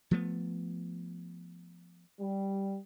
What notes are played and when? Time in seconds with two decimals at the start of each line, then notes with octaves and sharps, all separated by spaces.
0.11 F3 A3 B3
2.20 G3